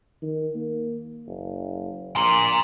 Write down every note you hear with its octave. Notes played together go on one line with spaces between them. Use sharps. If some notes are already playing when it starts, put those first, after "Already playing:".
D#3
A#3
F#1
A#1 A#5 C6